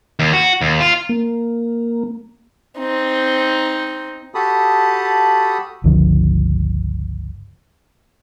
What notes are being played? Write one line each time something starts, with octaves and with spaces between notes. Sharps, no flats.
D#2
F#4
D#2
F4
A#3
C4 D#4
F#4 G4 A4 A5 B5 D#6
G1 C#2 D3 F3